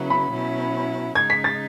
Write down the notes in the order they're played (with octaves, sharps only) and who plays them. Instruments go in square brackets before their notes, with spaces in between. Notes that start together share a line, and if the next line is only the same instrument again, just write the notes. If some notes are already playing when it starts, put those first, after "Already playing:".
Already playing: [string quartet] C#3 F#3 B3 E4
[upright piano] B5
[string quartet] B2 F#3 C#4 E4
[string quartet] C#3 G#3 D#4 [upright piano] G#6
[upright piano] B6
A6